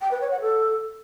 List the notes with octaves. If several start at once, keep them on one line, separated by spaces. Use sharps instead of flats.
G5
B4
C#5
F#5
A4